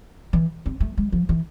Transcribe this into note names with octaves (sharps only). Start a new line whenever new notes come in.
E3
C4
A3
G#3
F3
E3